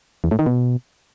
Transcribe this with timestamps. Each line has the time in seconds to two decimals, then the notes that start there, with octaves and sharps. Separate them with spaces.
0.24 E2
0.31 A2
0.39 D#3
0.46 B2